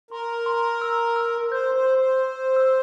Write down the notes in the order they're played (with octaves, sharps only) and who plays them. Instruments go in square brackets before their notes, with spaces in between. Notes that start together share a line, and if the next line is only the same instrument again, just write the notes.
[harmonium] A#4 [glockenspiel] C6
[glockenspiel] C6
E6
E6
[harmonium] C5 [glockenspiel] G6
[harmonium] C5
[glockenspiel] C6
[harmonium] C5
[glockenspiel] G6
E6